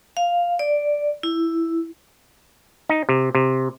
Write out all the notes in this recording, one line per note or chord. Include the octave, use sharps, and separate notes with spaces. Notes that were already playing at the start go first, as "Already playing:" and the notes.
F5
D5
E4
D#4
C3
C3